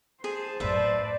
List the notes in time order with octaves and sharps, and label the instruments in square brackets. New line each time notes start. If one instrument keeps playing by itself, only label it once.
[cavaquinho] G#4 [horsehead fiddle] C5 A5
[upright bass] F#2 A2 [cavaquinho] B4 E5 [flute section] D5